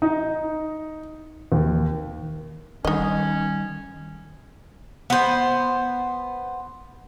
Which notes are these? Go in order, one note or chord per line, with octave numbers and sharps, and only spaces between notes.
D#4
D#2
D#3 G3 C#4 D#4 D#5
B3 C5